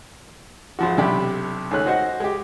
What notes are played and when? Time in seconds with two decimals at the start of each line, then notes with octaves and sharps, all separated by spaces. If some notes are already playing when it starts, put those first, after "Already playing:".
0.79 G#1 F3 F#4
0.98 B1 C3 D4 G4 B5
1.71 C#2 D#3 A3 C#4 F#6
1.86 F#4 C5 D#5 F#5
2.20 G#3 G4